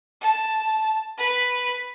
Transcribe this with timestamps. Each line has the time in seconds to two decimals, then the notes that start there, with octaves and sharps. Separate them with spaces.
0.21 A5
1.18 B4